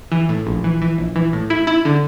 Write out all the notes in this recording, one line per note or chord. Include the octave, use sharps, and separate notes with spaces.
E3
A2
A#1
E3
E3
A#1
E3
A2
E4
E4
D3